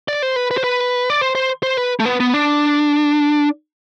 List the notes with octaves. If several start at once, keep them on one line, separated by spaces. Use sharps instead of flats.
D5
C5
B4
B4
C5
B4
D5
C5
C5
C5
B4
A3
B3
B3
D4